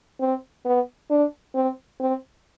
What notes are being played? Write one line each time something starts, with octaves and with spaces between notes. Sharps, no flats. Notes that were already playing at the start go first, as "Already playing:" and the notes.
C4
B3
D4
C4
C4